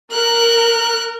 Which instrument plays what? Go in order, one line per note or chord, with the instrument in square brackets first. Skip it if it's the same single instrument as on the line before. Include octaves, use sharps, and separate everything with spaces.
[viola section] A#4 [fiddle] F#6